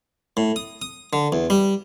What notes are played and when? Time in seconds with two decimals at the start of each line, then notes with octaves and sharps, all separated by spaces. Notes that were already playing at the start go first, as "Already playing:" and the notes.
0.37 A2
0.56 D#6
0.82 D#6
1.13 D3
1.32 E2
1.50 G3